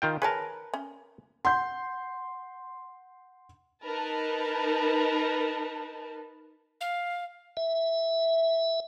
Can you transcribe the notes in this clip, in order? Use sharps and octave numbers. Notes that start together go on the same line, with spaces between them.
D#3 F4 G5
G#4 A#4 B4 C#5 A5
C#4
F#5 C6 G6
D#4 A#4 B4 A5
F5
E5